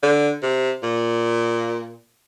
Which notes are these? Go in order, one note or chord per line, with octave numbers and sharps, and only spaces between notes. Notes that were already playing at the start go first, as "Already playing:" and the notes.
D3
C3
A#2